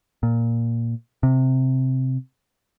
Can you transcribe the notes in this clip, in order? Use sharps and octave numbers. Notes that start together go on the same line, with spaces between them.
A#2
C3